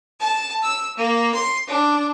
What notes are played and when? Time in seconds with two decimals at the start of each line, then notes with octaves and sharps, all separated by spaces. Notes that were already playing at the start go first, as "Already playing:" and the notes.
0.21 A5
0.64 E6
0.98 A#3
1.34 C6
1.68 D4